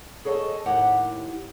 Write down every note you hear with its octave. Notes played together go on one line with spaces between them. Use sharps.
G#4 A4 C#5 D#5 F5 A5
D#2 A2 G4 F#5